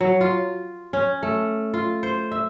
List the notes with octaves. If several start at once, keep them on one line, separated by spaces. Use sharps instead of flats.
F#3
F4
C#4
A3
F4
C5
E5